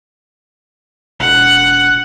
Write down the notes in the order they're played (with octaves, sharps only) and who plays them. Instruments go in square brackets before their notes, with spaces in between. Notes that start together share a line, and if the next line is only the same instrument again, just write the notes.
[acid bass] E1 [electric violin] F#5